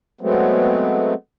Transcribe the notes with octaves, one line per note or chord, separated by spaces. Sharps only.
F#3 G#3 A3 B3 C4